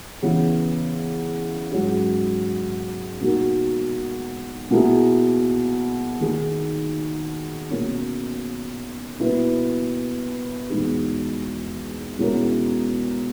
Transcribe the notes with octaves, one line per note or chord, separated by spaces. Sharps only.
C#3 E3 B3
G#2 F#3 C#4 G#4
B2 A#3 D#4 F#4 A#4
B2 A#3 E4 G#4
D#3 A#3 D#4 G#4
B2 A#3 C#4
B2 A#3 E4 B4
E2 B2 G#3 D#4
B2 G#3 C#4 E4 A#4